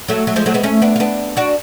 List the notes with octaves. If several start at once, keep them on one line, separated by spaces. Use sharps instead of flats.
F#3 A3
F#3 A3
F3 G#3
F#3 A3
G#3 B3
A3 C#4
B3 D4
F4
B3 D4
D4 F#4